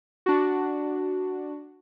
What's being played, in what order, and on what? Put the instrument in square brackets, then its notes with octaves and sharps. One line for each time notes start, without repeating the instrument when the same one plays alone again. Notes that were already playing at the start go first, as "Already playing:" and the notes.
[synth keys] D4 F#4